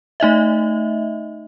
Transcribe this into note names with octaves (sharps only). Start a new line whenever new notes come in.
A3 D#4 D#5 E5